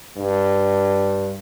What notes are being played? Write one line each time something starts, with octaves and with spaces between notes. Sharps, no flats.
G2